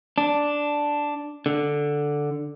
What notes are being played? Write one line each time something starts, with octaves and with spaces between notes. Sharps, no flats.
D4
D3